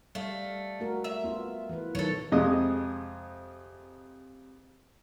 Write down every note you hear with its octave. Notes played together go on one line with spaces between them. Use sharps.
G3 A3 F5
A3 F#4 A#4
E5
B3 F4
E3 B4
B2 D#3 F#3 A4 C#5
F2 C3 G#3 D#5